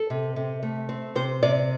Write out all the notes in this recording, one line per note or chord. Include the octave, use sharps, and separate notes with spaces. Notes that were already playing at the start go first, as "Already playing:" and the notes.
Already playing: A4
C3
C3
A3
C4
C3 C5
C3 D5